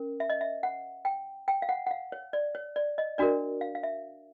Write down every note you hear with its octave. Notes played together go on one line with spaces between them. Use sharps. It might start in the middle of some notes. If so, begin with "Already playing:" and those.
Already playing: C#4 A#4
E5
D#5
E5
F#5
G5
G5
F5
F#5
F#5
F5
C#5
D5
C#5
D5
D#5
D4 F#4 A#4 D5
F5
F5
E5